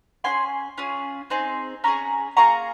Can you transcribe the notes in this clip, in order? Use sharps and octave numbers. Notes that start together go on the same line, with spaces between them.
C#4 F4 G#4 G#5 C6
C#4 F4 G#4
C4 D#4 G#4
C#4 G#4 A#5 C#6
A#3 F4 G#4 A#5 C#6